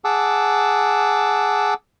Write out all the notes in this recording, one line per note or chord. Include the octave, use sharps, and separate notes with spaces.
G#4 F#5 A5 D6 E6